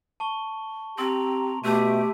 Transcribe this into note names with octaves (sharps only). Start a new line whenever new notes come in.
A5 C#6 G7
C4 G4 A#5 C6
B2 A3 G4 E5 A5 E6 D#7